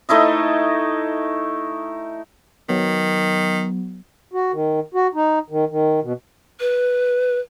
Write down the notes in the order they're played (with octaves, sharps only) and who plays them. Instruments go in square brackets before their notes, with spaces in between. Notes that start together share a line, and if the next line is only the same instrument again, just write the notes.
[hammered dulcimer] A3 D#4 E4 D#5
[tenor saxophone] D#3 [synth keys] F#3 B3
[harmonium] F#4
D#3
F#4
D#4
D#3
D#3
B2
[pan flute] B4